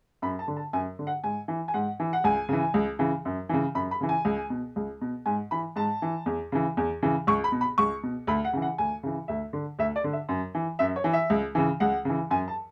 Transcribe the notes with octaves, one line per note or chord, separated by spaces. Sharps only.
F#2 B5
A5
D3
A5
F#2 G#5
D3
F#5
G#2 G#5
E3
G#5
G#2 F#5
E3
F#5
C#2 G#5
C#3 E3
C#2
C#3 E3
F#2
C#3 E3
F#2 B5
B5
C#3 E3
G#5
C#2
B2
C#2
B2
G#2 G#5
E3 B5
G#2 A5
E3
E2
C#3 E3
E2
C#3 E3
C#2 C#6
B5
B2
B5
C#2 C#6
B2
D2 B5
F#5
C#3 E3
F#5
D2 G#5
C#3 E3
D2 E5
D3
D2 E5
D5
D3
E5
F#2
E3
F#2 E5
C#5
E3
E5
C#2
C#3 E3
C#2 F#5
C#3 E3
F#2 G#5
A5